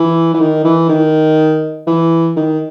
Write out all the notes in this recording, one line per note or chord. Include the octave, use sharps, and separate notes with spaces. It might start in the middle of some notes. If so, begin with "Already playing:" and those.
Already playing: E3
E3
D#3
E3
D#3
E3
D#3